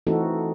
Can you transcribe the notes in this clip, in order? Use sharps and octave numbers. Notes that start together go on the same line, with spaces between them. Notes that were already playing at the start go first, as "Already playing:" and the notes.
E3 A3 C4 D#4 F#4 A4